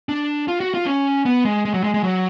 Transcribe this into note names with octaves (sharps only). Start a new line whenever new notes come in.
D4
F4
F#4
F4
C#4
B3
G#3
G#3
F#3
G#3
G#3
F#3